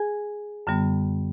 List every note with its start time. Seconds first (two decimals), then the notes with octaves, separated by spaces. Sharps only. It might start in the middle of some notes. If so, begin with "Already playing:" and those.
Already playing: G#4 G#5
0.67 F#2 D3 G3 B3